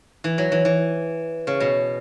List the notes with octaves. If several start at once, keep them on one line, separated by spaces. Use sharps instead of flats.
E3
F#3
E3
E3
C#3
B2